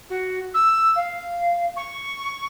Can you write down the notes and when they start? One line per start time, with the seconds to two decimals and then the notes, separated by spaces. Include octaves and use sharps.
0.09 F#4
0.54 E6
0.95 F5
1.76 C#6